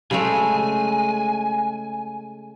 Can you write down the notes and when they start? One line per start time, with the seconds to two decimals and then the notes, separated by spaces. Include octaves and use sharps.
0.11 C#3 G#3 A3 G#5